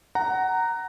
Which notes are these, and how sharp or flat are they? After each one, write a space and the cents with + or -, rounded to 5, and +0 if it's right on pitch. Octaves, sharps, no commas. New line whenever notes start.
F#5 +20 A#5 -10